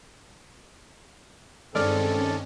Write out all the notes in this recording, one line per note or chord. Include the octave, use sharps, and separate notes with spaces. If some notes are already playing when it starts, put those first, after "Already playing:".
G2 D#3 G#3 C4 C#4 A4 D5 F6